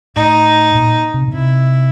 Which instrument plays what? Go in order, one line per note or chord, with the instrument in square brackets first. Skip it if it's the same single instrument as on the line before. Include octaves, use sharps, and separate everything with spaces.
[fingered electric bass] A2 [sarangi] D#4
[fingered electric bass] A#2
C3
B2
[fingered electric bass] C3 [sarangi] E4